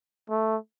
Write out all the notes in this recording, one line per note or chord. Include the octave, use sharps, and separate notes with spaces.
A3